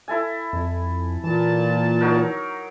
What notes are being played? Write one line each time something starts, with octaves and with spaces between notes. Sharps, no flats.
E4 A4 G#5
F2
A#2 E3 A5
F#3 D#4 A#4